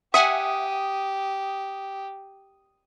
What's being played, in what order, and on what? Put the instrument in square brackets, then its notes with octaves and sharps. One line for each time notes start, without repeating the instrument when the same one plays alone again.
[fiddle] G4 [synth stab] E5 F#5 G#5 [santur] D#6